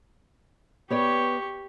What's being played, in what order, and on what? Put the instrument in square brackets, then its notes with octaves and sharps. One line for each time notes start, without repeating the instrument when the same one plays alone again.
[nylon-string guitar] B3 C#5 D5 [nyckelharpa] G4 C#6